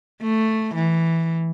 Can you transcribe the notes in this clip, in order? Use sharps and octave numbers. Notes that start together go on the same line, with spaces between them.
A3
E3